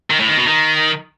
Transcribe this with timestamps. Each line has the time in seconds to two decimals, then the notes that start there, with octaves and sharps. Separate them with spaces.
0.11 D#3
0.19 A2
0.28 D#3
0.37 B2
0.46 D#3